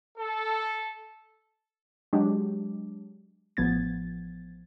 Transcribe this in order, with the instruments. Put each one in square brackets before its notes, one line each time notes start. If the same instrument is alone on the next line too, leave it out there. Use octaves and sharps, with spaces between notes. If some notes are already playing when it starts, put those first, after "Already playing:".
[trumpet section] A4
[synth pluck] F#3 G#3 D4 G4
A1 F3 B3 G#6 A6